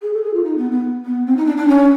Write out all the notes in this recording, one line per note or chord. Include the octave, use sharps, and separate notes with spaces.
G#4
A4
G#4
F4
D#4
B3
B3
B3
C4
D#4
D4
D4
C#4